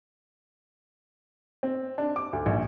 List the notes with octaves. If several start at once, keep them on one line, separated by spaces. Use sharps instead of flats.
C4
D4
D6
D2
A#1